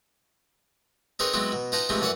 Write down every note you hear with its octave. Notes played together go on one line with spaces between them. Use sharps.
C4 D#4 G#4 A#4 B4 C#5
F#3 G#3 B3 C4 E4 F#4
B2
D#4 F4 B4 G5 A5 A#5
C3 E3 F3 G#3 A3 C4
F#2 E3 C#5 D5 E5 F#5